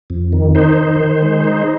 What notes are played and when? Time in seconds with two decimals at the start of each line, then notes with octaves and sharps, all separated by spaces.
0.10 F2
0.33 D#3
0.55 D#4 C5
0.77 D#3
1.00 D#3
1.22 G#3
1.44 D#4